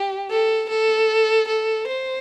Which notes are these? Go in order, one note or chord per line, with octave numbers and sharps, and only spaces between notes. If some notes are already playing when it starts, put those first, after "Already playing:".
Already playing: G4
A4
A4
A4
C5